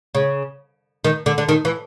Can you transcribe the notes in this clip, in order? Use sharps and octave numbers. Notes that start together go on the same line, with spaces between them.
C#3
D#3
D3
D3
D#3
E3